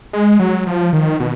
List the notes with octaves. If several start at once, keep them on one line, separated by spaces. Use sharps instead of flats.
G#3
F#3
F3
D#3
B2